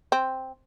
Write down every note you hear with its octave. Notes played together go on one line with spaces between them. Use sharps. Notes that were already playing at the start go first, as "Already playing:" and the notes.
C4